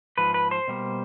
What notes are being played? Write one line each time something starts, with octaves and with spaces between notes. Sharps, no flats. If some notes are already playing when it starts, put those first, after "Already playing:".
G#2 F3 B4
B4
C5
B2 G3 A#3